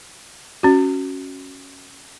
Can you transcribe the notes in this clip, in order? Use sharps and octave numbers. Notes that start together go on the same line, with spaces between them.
C#4 F#4